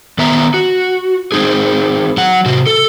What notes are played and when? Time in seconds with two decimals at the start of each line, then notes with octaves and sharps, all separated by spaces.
0.18 D#3 B3 E5 A#5
0.54 F#4
1.32 C4 D#4 G#4
2.17 F#3 F#5
2.46 C3 F#4
2.66 A4